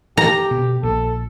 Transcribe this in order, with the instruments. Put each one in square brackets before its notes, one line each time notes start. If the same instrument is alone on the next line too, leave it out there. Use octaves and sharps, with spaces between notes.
[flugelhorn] G4 [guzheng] A#5
[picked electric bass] B2
[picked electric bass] A#1 [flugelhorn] A4